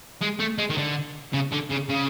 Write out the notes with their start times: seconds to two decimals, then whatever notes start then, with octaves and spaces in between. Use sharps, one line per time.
0.22 G#3
0.40 A3
0.58 G#3
0.70 D#3
0.78 D3
1.34 C#3
1.53 D3
1.71 C#3
1.90 C#3